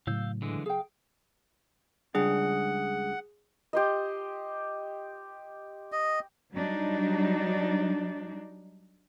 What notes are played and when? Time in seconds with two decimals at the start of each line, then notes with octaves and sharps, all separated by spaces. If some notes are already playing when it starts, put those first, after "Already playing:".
0.07 A2 C#3 F#3 F5 E6 G6
0.42 D3 E3 G#3
0.66 G#4 F5 G5
2.15 C#2 G3 D4 G#4 F#5
3.73 G4 C5 D#5
5.92 D#5
6.53 F#3 G3 D4 D#4